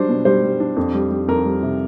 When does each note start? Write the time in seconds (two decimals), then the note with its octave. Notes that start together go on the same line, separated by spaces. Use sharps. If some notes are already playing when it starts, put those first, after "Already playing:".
Already playing: F#3 G3 D4 C5
0.09 B2
0.25 G3 C5
0.43 G3
0.60 D4
0.77 F2
0.94 G3
1.11 G3
1.28 F2 A#4
1.46 G3
1.63 C3